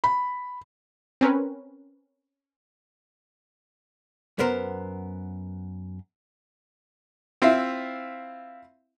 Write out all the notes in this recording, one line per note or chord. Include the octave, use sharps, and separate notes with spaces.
B5
C4 C#4 A#4 B4
F#2 B3 A#4 C5 A#5
C4 E4 F4 E5 F5